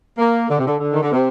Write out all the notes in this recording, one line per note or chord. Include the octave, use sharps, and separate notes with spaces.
A#3
D3
C3
D3
D3
D#3
D3
C3